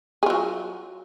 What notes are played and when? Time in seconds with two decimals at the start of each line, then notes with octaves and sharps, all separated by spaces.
0.23 G#4
0.26 F4
0.30 F#3